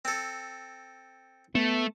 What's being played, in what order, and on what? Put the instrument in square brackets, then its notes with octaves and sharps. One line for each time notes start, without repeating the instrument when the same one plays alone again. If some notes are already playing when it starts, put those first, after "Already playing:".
[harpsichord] C4 A4
[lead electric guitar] A3 [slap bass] B3